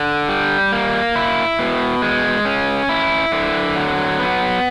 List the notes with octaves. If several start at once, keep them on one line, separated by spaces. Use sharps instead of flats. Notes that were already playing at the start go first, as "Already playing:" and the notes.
Already playing: D3
G3
A#3
E4
B2
G#3
C#4
E4
D3
F#3
B3